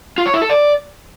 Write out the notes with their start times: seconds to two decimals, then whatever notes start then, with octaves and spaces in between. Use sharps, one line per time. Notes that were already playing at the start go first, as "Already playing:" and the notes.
0.18 F4
0.26 C#5
0.34 E4
0.42 A4
0.50 D5